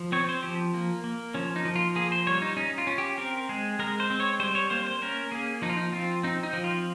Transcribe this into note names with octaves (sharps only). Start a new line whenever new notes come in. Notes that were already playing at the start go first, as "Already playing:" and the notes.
Already playing: F3
C4 C#5
C5
F3 G4
A#3
A#3
F3 C#4
D#4
F3
F4
A#3 G#4
C5
G3 C#5
D#4
C#4 D#4
F4
C#4
G4
C4 A#4
G#3 G#4
G#3 A#4
C5
C4
C#5
G3 C5
C#5
A#3 C5
C5
C#4 A#4
A#3 G#4
F3 D#4
F4
D#4
C4 F4
C4 D#4
D#4
F3
F4